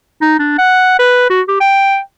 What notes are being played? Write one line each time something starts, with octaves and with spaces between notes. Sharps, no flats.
D#4
D4
F#5
B4
F#4
G4
G5